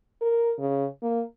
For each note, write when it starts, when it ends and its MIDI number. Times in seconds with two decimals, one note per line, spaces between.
0.21 0.52 70
0.59 0.85 49
1.02 1.22 58